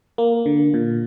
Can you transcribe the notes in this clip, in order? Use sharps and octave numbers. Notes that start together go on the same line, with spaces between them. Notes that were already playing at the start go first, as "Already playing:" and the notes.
A#3
D3
A#2